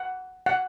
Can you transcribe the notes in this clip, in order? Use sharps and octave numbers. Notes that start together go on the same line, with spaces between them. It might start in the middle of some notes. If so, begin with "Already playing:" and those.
Already playing: F#5
F#5